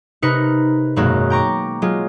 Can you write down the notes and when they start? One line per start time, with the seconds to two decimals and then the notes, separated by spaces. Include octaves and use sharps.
0.22 C3 D#4 A#4 B4 C#7
0.96 G#1 F#2 B2 G#3 A#3 F#4
1.30 G5 A#5 C#6 D6
1.82 F#3 G#3 F4